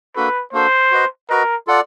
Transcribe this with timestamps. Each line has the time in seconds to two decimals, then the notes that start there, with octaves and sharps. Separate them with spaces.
0.16 A#3 D4 F#4 A4 B4
0.53 A#3 D4 F#4 A4 C5
0.91 F#4 B4 D#5
1.30 F#4 A#4 B4 D#5
1.67 F4 A4 D5 F#5